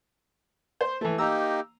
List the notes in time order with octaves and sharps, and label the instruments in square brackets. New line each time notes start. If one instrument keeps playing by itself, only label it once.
[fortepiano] C5
E3 A3
[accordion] A#3 D#4 G4 [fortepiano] A#5 E6